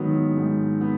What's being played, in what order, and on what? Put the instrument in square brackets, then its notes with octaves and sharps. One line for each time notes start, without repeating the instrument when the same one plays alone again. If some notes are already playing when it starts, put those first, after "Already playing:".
Already playing: [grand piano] G#2 D#3 F#3 B3
G#2
B3